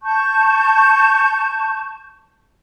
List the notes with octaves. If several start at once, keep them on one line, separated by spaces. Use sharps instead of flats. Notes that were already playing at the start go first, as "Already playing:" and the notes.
A5 C#6 G6